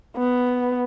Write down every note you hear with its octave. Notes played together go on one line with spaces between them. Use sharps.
B3